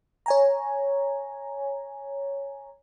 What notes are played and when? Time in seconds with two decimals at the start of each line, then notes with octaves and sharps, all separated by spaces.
0.26 C#5 G#5 A#5